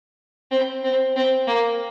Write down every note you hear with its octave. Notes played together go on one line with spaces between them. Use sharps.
C4
C4
C4
A#3